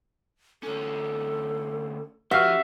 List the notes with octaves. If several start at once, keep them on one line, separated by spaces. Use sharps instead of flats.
D2 C#4 A4
F3 C#4 F#4 G4 E5 F5